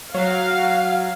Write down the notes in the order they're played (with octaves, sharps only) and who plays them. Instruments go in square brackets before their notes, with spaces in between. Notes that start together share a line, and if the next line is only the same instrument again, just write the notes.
[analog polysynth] F#3 [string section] F5